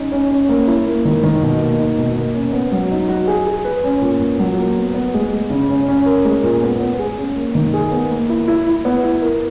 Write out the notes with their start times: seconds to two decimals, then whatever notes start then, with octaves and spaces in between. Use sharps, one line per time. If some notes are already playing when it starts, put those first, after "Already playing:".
Already playing: C#4 D#4
0.12 C#4
0.31 C#4
0.49 A#3
0.67 E4
0.86 A#3
1.05 D#3
1.23 D#3
1.42 B2
1.61 A#3
1.79 D#4
1.98 B2
2.16 A#3
2.35 C#4
2.53 B3
2.72 F#3
2.91 D#4
3.09 F#4
3.28 G#4
3.47 G#4
3.65 B4
3.84 C#4
4.01 A#2
4.21 A#2
4.39 F#3
4.58 A#3
4.77 B3
4.94 B3
5.14 G#3
5.33 G#3
5.50 C#3
5.69 C#4
5.88 C#4
6.06 A#4
6.25 G#3
6.43 A#2
6.63 B3
6.80 B3
6.99 G#4
7.18 C#4
7.36 A#3
7.55 D#3
7.74 G#4
7.92 B3
8.10 A#3
8.29 E4
8.48 E4
8.67 E4
8.85 B3
9.03 E4
9.22 A#4